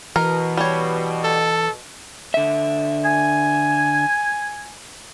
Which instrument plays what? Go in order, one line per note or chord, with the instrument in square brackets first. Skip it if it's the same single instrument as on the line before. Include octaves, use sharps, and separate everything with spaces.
[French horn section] B2 [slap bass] E3 [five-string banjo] A#4
[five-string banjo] G3 C#5
[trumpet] A4
[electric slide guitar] D3 E5
[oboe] G#5